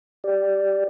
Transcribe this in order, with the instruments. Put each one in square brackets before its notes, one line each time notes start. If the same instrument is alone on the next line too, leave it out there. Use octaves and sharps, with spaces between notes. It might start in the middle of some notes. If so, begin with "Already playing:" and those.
[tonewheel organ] G4 D5